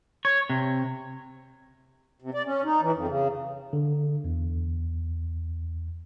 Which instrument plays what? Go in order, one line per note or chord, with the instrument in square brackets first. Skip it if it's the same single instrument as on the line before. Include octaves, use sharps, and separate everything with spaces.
[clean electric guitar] C#5
C3
[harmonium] C3
D5
C#4
D#4
E3
F2
C#3
[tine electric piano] D3
E2